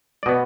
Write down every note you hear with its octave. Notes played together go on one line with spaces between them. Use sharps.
D5
B2 B3 D#5